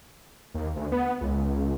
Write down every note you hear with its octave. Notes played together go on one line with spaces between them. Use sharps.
D#2
D2
B3
C#2
C#2